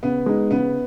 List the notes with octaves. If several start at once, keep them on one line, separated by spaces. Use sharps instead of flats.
C#3 B3
G#3 D#4
C#3 B3